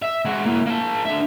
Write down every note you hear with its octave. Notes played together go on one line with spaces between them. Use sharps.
E5
G#3 F#4
A#3 E4
A#3 A5
D3 E5